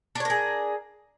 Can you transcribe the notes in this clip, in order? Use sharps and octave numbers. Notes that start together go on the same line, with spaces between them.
D4 G#4 A#4 C#5